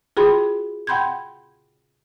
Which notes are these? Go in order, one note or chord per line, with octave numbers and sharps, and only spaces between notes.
F4 F#4 G#4 G5 B5 C6
F#5 G5 B5 C6 G6 G#6